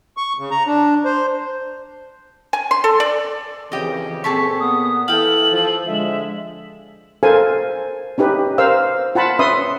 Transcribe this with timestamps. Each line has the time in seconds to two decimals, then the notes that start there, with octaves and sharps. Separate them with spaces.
0.17 C#6
0.39 C#3
0.51 A#5
0.66 D4
1.05 C5
2.53 G#5
2.71 C6
2.84 A4
3.00 D5
3.72 F2 C#3 E3 G4 D#5
4.24 A#2 C4 G#4 A4 C#6 B6
4.60 B3 D#6
5.08 E3 E4 A4 F5 G5 F#7
5.52 F3
5.86 D3 F3 G#3 E5
7.23 A4 A#4 C5 F5 G#5
8.18 C#4 D#4 G4 B4
8.58 A#4 C5 F5 E6
9.15 F4 F#5 A5 B5
9.39 C#4 B4 E5 B5 C6 D#6